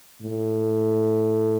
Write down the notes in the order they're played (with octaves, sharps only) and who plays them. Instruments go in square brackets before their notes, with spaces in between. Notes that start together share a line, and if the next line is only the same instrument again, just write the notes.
[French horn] A2